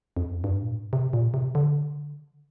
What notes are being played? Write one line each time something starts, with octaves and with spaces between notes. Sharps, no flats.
F2
G2
A#2
A2
C3
A#2
C3
D3